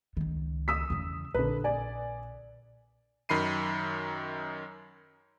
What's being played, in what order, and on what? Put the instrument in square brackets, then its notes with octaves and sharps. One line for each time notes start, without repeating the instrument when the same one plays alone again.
[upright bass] C#2 D#3
[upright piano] D#6 E6 B6
[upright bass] E2 C#3
[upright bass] A#1 [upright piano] D3 B4
[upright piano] D5 G#5
[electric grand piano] F#2 D#3 B5 C7 D#7